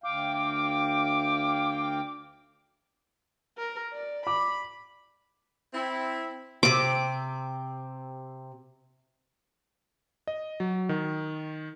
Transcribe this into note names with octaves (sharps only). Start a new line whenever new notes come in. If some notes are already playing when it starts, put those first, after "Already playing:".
D2 F5 G5 D6
A#4
D5
B5 D6
C4 E4
C3 C4 D6
D#5
F#3
D#3